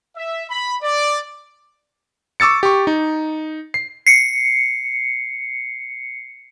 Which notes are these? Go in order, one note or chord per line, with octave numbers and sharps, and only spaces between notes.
E5
B5
D5
C#6 D6 E6 A6 C#7
G4 C#6
D#4
C7
C7 C#7